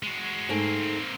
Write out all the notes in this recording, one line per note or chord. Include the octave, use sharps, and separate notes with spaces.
G#3 F#4
G#2 A3 A#3 C4